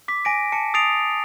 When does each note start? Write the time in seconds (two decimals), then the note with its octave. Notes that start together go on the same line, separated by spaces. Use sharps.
0.08 D6 B6
0.25 G#5 A#6 D7
0.52 A5 C#7
0.74 D#6 A6 C7 D7 F7